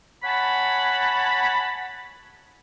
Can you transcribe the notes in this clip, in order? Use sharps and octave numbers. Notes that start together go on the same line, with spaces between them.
C#5 F#5 G#5 A5 B5